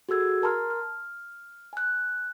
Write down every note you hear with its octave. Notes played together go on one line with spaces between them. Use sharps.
F#4 G#4 A4 E6 G#6
A#4 A5 A#5 C6 F6
F6
G#5 F#6